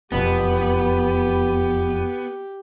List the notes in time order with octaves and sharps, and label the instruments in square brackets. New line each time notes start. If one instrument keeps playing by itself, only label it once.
[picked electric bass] E1 F2 B2 [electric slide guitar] B3 [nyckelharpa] G4